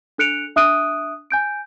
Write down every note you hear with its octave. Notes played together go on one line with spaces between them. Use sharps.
D4 A4 F#6 C#7 D7 F7
D4 E5 D#6 F#6 D7 D#7
G#5 G6 D7